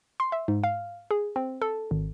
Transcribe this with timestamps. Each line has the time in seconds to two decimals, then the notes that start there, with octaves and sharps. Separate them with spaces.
0.20 C6
0.32 E5
0.48 G#2
0.64 F5
1.11 G#4
1.36 C4
1.62 A4
1.91 G#1